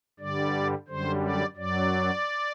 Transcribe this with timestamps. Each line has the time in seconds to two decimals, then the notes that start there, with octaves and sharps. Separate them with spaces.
0.20 G2 D3 G3 D5
0.88 F#2 D3 G3 C5
1.22 D5
1.56 F#2 F#3 D5